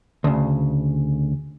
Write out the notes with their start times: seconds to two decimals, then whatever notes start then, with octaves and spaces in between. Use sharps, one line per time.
0.24 D2 C#3